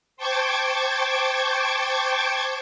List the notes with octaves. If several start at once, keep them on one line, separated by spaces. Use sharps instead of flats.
C5 G5 A5 C#6 D6 G#6